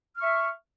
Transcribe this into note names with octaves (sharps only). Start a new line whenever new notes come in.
E5 C#6 F6